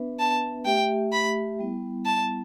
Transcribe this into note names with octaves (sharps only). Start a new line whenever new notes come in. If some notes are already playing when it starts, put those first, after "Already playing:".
Already playing: B3 D4 B4 E5
A5
A3 G4 E5 G5
B5
G3 B3 E4
A5